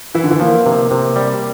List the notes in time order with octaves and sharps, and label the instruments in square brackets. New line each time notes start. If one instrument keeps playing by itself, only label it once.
[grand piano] E3 [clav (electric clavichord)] E4
[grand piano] D3
E3
[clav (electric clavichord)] F3 [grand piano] A#3
[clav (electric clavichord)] C3 [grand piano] A#3
[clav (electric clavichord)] C3
G3